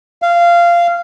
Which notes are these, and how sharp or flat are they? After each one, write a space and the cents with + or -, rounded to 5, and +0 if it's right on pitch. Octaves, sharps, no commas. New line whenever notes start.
F5 -15